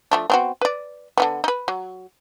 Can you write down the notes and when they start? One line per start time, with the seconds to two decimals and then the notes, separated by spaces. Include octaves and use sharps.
0.11 F3 A3 D4
0.30 B3 C4 F#4
0.61 B4 D5
1.18 D3 F3 B3
1.44 D#4 B4
1.68 F#3